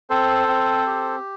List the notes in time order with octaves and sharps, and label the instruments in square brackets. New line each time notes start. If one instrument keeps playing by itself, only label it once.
[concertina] C4 A4 C5
C4
G4